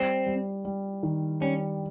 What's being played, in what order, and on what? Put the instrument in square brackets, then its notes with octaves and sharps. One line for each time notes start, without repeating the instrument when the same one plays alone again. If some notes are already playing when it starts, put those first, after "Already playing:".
Already playing: [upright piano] G3 [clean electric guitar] C4
[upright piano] G3
G3
D#3
[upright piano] G3 [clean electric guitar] C#4